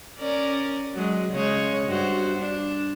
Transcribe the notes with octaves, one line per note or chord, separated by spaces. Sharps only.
C#4 A#4 D5
F#3 G#3
C#3 G#3 C#5
G2 F#4 C5
D4